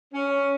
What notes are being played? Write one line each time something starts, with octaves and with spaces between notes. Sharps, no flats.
C#4